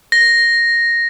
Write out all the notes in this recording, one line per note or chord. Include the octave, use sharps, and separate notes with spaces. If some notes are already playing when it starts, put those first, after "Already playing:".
A#6